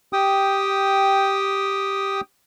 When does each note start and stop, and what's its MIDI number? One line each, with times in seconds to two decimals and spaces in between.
0.13 2.21 67
0.13 2.21 79
0.13 2.21 87